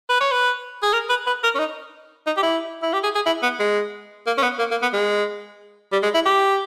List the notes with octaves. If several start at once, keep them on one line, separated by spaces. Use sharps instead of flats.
B4
C#5
B4
G#4
A#4
B4
B4
A#4
C#4
D#4
D#4
G4
E4
E4
G4
G#4
G#4
E4
B3
G#3
A#3
C#4
B3
A#3
A#3
B3
G#3
G3
G#3
E4
G4